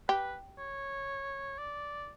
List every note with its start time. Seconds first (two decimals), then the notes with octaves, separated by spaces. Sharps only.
0.08 G4 B4
0.58 C#5
1.58 D5